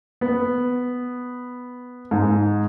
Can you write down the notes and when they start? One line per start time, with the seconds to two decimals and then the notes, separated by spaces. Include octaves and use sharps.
0.21 B3
2.11 G#2